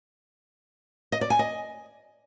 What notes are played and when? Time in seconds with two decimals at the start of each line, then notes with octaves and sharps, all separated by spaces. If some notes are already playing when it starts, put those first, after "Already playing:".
1.12 D#5
1.21 D5
1.30 G#5
1.39 D#5